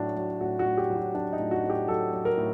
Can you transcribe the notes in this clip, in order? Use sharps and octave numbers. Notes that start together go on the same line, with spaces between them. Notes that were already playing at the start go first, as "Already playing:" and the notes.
Already playing: A2 F#3 D4
F#3
A2 F#4
F#4
A2
G4
F#3
F#4
F#3 D4
D#4
A2
F#4
A2
G4
F#3 A4
F#3
A#4
A2